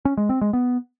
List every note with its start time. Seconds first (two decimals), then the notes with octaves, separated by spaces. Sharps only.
0.05 C#4
0.17 G#3
0.29 C4
0.41 G#3
0.53 B3